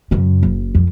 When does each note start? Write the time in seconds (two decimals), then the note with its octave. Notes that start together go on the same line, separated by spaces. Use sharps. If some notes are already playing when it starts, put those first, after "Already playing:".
0.11 F#2 C#3
0.43 F#1
0.75 F2